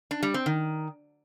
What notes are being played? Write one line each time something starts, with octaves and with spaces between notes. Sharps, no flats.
D4
G3
C4
D#3